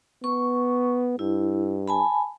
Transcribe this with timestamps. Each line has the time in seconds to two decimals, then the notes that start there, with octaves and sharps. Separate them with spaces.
0.24 B3 C#6
1.19 G2 E4
1.88 G#5 A5 B5